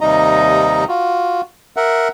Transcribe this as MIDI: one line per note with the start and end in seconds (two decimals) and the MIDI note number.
0.01 0.84 39
0.01 0.84 48
0.01 0.84 55
0.01 0.84 63
0.01 0.84 75
0.01 0.84 82
0.88 1.41 65
0.88 1.41 66
1.77 2.08 70
1.77 2.08 76
1.77 2.08 78